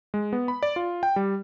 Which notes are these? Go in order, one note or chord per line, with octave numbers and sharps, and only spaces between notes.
G#3
B3
B5
D5
F4
G5
G3